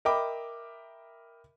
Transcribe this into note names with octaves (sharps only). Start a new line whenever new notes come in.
A#4 D#5 E5 G5 B5 D6